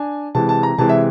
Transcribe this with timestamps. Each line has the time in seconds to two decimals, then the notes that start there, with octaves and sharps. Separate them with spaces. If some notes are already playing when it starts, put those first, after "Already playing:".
Already playing: D4 G#5
0.35 C3 E3 G#3 A5
0.49 A5
0.63 A#5
0.78 C3 E3 G#3 A5
0.89 E5